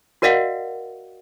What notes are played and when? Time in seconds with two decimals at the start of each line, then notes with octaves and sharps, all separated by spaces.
0.22 F#4 A#4 D5 D#5 F5 F#5